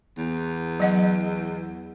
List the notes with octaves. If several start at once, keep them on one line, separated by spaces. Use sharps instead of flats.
E2
F#3 D#5 F#5